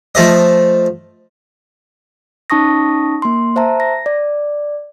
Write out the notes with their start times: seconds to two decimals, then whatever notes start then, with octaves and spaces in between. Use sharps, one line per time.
0.15 F3 A3 D#5
2.50 C#4 D#4 A5 C#6 D#6 A#6
3.22 A#3 C6
3.56 C5 E5 A5 A#5
3.80 A#6
4.06 D5